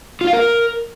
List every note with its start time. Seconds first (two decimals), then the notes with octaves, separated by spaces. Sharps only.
0.21 F4
0.27 F5
0.33 A#4